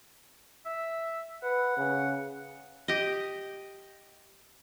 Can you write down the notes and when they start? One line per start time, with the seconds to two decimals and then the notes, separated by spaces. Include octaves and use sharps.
0.65 E5
1.43 B4 F#5
1.77 C#3
2.88 G4 D#5